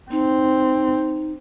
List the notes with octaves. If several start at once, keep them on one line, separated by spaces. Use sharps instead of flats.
C4 D#4